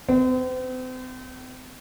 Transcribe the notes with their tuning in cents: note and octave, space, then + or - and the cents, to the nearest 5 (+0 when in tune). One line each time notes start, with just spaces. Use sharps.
C4 -40